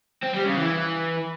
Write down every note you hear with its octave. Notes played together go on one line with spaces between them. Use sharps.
C4
G3
C#3
E3